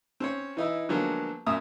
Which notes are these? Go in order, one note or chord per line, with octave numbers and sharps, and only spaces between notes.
C4 C#4 C#5
E3 D#4 E4
D3 F3 F#3 G#3 A#3 B3
F#2 A#2 E5 A#5 D#6